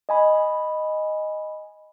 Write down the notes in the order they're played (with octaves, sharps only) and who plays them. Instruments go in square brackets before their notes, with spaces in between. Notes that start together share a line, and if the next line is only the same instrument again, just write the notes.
[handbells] D#5 G#5 B5